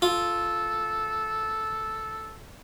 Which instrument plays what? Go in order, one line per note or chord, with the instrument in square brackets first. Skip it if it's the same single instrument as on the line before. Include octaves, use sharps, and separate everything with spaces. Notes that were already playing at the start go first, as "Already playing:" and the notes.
[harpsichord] F4 [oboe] A4